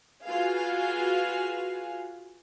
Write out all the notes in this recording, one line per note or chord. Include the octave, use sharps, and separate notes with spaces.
F4 F#4 G#4 B4 F5